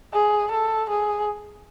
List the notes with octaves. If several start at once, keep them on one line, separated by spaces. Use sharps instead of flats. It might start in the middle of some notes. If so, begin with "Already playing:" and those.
G#4
A4
G#4